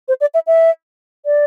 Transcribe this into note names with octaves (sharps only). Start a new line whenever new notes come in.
C5
D5
E5
E5
D5